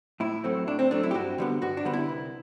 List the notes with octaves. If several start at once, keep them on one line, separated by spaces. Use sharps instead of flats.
A2 E4
F#3 A3 C4
A2 D4
C4
F#3 A3 C4 D4
E4
G4
G2 F#4
D3 G3 B3
G2 F#4
D4
D3 G3 B3
E4
C2